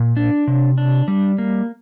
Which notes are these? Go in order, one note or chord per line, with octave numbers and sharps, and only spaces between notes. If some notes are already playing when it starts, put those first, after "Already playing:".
Already playing: A#2
D4
C3
D4
G3
A#3